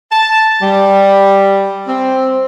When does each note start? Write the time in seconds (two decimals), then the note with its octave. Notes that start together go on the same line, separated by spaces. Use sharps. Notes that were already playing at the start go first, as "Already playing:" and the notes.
0.11 A5
0.61 G3
1.87 C4